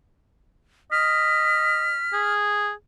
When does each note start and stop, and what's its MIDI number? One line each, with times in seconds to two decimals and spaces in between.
0.92 1.95 75
0.92 2.34 89
0.92 2.20 95
2.13 2.72 68